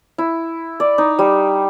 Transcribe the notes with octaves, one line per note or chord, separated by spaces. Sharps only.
E4
D5
D#4
G3